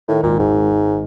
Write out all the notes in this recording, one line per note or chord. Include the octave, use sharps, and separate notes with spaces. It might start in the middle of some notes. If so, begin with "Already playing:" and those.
A2 D#3
G#1 A#2
G#1 G#2
G#1
G#1